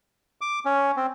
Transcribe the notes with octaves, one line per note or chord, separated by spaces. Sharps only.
D6
C#4
C4